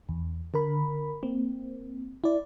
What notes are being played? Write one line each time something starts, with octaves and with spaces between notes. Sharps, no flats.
E2
D3 A#4 B5
A#3 C4
E4 D5